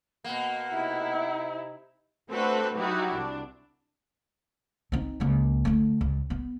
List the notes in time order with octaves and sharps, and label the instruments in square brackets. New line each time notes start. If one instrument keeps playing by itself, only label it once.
[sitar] B2 A#3 [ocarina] F#5
[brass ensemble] C3 D#4 [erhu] E4
[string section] A3 C4 D4 F#4 A4 B4
F#3 D#4 E4 F#4 G4
C2 D4
[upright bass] C4 D#4
C#2 A#3
D3 A3
C#2
B3